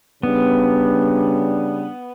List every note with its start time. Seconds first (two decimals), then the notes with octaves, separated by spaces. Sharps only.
0.23 C#3 G3 B3 D4